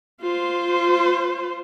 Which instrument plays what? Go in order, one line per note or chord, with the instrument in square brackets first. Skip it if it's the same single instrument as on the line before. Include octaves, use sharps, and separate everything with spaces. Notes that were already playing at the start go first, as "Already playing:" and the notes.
[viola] F4 C5